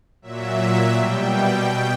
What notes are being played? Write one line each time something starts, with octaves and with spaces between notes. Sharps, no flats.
A#2 F#3 E5
B2 G3 G5
B2 G5